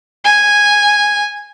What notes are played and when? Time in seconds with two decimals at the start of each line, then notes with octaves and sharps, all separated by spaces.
0.24 G#5